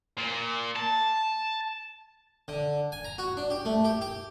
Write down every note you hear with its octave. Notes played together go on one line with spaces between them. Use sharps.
A#2
A5
D3
G#5
A#5
F#4
D4
G4
A3
G4
G4